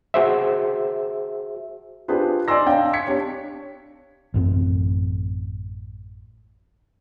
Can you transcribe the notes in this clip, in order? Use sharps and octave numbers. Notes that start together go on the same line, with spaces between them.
F#4 G#4 C5 E5
D4 F4 G4 G#4 B4 C5
D5 D#5 G#5 C6 E6 A#6
D4 C#5 F5 G5
G#6 B6 C#7
D4 G4 C#5
A1 F#2 C4